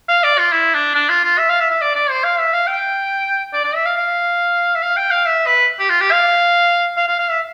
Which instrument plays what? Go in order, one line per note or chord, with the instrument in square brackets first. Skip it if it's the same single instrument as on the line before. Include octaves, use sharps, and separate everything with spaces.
[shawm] F5
D5
F4
E4
D4
D4
F4
F4
E5
F5
E5
E5
D5
D5
C5
F5
E5
F5
G5
D5
D5
E5
F5
F5
E5
F5
G5
F5
E5
B4
G4
F4
G4
F5
F5
F5
F5
E5